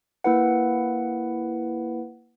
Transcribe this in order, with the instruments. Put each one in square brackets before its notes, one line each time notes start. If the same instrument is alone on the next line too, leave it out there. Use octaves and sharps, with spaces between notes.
[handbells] A#3 E4 B4 F#5